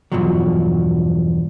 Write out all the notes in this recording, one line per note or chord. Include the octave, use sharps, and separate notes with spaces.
E2 G2 B2 F3 F#3